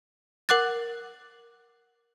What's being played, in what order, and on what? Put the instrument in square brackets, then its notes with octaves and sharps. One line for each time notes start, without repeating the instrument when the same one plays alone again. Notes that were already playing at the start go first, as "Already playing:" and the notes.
[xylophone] A#4 F#5 D6 F#6 A6